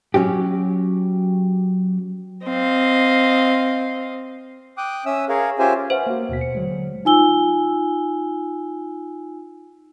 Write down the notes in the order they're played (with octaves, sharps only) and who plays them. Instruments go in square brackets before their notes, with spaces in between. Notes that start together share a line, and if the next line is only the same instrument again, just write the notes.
[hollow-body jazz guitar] F#3 C#4 F#4 G4
[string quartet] C4 D#5 F5
[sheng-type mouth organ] G5 D6 D#6 F#6
C#4 E5 D#6 E6
G#4 A#4 C#5 F5
C#4 F4 G4 C5 E5 G#5
[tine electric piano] B4 E5 F#5 [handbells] C5
[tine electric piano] A#3 F#4
D#2 B2 B6
C#7
D3 F#3 G#3
[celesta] D#4 F4 G#5 E6 G7